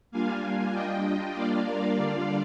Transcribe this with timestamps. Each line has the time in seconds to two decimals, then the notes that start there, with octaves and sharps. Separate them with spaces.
0.11 G3 A#3 D4 F4 F5 G#5
0.72 G3 D4 F4 D#5 G5
1.34 G3 A#3 D4 F4 D5 F5
1.65 A#4 D5
1.96 D3 G3 D4 F4 D5 F5